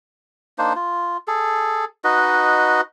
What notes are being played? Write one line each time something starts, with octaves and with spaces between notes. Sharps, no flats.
A#3 D4 D#4 C5
F4
G#4 A4
D#4 F#4 B4 D#5